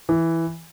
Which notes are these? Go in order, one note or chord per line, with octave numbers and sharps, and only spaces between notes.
E3